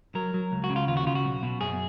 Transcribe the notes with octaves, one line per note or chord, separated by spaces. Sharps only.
F#3 A#4
F#3
C#2
F#4
C#3
F4
D#2 F4
F#4
C#3 F4
F#4
B1
B2
F#2 G#4